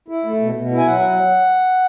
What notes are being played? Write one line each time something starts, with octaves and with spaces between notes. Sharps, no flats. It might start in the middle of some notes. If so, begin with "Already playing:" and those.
E4
A3
B2
B2
E4
G#5
F#3 F#5